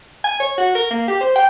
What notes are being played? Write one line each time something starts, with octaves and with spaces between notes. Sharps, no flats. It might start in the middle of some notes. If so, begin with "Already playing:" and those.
G#5
C#5
F#4
A#4
A#3
G4
C5
G5